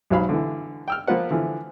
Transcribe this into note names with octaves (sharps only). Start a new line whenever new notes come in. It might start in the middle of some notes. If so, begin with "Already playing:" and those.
B1 G#2 F#3 D#4 F5 B5
D3 E3
G5 E6 F6
F3 A#3 F4 B4 F#5
D3 E3 F3